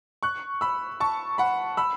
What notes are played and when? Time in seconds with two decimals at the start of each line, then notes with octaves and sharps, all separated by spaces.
0.23 C#6 F#6
0.61 B5 E6
1.00 A5 C#6
1.38 F#5 B5
1.77 B5 E6